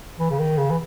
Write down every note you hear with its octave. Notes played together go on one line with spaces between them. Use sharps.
E3
C#3
D#3
C#3
E3